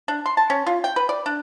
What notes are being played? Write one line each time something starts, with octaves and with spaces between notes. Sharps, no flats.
D4
C6
A5
C#4
F4
G5
B4
D5
D4